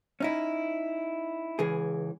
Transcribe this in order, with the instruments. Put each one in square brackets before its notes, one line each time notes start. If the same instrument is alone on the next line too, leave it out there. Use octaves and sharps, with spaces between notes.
[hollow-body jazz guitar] C#4 D#4 E4
C#2 E3 G#4